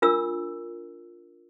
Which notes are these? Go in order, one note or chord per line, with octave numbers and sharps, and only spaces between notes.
D4 F4 A#4 E6